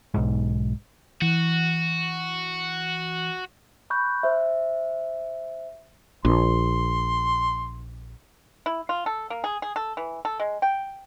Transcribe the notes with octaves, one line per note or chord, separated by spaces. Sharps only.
B1 G#2
E3 F#4
B5 C#6 F#6 G6
C5 E5
A#1 C6
E4
F4
A4
A#3
G#4
G#4
A4
E3
A4
G#3
G5